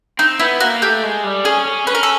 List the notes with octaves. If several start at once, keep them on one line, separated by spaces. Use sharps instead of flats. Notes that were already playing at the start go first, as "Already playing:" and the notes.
C4 D#4
B3 E4
A#3 F#4
A3 G4
G#3
G3
C#4 G#4
C#4
C#4 B4
A#4
A4